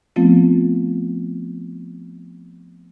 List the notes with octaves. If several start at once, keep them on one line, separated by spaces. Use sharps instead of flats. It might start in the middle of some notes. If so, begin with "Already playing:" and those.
F3 A3 B3 C4 F4